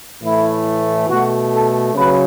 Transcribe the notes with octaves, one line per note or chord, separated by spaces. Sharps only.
A2 E3 A3 E4
B2 A3 F#4
A4
C#3 F#3 B4